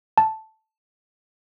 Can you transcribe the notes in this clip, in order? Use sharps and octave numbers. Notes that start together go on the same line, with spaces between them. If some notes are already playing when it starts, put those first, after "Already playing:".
A5